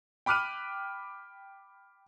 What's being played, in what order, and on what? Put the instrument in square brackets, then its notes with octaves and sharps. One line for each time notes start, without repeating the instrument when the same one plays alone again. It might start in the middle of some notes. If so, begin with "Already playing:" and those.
[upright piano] G5 B5 D6 F6 F#6 D#7